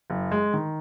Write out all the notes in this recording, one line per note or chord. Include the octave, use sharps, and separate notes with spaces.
F#1
G#3
D#3